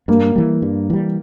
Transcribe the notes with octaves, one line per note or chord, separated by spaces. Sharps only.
G2 A#3
E3 G3
G2
E3 G3